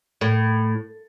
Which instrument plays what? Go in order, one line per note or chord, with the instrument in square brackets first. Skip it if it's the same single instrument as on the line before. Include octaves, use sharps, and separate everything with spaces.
[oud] A2